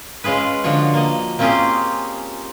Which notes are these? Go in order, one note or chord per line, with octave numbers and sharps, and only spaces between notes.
G#3 C#4 F4 G#4 B4
D3 F3 F4 F#4 C#5
A#3 D#5
A#3 C4 C#4 F4 G4 G#4